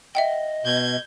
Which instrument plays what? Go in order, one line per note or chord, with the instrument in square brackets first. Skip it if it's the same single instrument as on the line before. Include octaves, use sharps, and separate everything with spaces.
[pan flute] D#5 [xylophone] E5 F#5 G5
[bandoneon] B2 [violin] G6 G#6